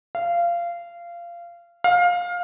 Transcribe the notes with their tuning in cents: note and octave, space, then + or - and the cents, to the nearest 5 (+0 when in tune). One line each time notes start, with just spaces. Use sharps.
F5 -20
F5 +20